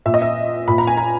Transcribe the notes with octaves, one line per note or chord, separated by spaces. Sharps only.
A#2 E5
D#5
E5
A#2 B5
A#5
G#5
A#5